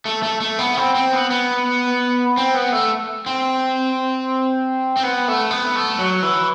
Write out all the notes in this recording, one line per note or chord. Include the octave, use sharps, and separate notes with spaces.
A3
A3
A3
B3
C4
C4
B3
B3
C4
B3
A3
C4
C4
B3
A3
B3
A3
F#3
E3